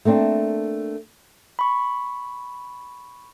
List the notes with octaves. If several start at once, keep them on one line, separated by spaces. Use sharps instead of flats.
A3 A#3 C4 D4
B5 C#6